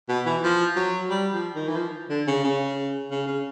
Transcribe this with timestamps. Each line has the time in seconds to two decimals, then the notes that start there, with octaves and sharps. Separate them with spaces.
0.08 B2
0.26 E3
0.43 F3
0.76 F#3
1.10 G3
1.32 F3
1.55 D#3
1.68 E3
1.76 F3
2.10 D3
2.27 C#3
2.44 C#3
3.11 C#3
3.27 C#3